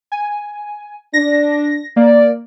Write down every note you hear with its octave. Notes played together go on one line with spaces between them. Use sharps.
G#5
D4 A#6
A#3 D5